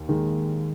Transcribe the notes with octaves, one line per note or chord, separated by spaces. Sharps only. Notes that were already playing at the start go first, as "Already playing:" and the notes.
Already playing: D#2
D#3 G#3